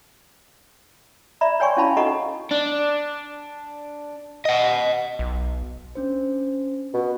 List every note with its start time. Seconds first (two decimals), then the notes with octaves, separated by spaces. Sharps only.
1.41 D5 E5 A#5 B5
1.60 C#5 D5 G5 G#5 C6 C#6
1.77 C#4 E4 F5 A5 B5
1.97 D#4 A4 D#5 F#5 A#5 C#6
2.51 D4
4.45 D#5 F#5
5.19 B1
5.95 C#4 D4 C5
6.94 B2